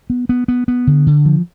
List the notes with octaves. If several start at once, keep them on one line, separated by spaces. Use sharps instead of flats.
B3
B3
B3
B3
D3
D3
F3